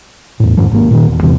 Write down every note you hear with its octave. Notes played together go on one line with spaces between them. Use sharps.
E2 A2
F2 G#2 D#3 F3
G#1 G#2 D#3 A#3
A#2 D3 D#3
E1
E2 G2 C3 E3